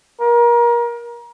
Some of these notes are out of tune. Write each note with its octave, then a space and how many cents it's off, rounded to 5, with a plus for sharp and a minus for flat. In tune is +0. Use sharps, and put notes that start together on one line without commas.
A#4 +30